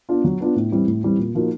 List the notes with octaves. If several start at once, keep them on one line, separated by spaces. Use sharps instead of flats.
B3 D4 F4
F#3
B3 D4 F4
A2
E3 G3 C4
A2
E3 G3 C4
A#2
F3 A#3 D#4 F#4